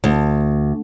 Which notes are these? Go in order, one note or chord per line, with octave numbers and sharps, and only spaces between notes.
D2